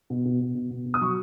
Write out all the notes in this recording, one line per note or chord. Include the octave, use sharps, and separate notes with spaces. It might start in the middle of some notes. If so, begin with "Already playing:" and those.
B2
B2
B2
B2
B2
B2
D#6
F#3 C#6